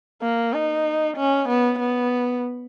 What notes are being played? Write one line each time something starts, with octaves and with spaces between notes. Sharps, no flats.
A#3
D#4
C#4
B3
B3